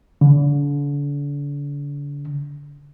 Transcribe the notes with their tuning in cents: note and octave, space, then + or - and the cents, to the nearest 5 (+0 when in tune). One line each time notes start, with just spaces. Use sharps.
D3 -40